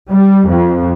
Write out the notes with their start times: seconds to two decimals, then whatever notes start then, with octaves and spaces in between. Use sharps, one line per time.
0.11 G3
0.48 F2